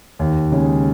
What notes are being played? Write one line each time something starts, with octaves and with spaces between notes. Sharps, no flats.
D#2
C#3 G#3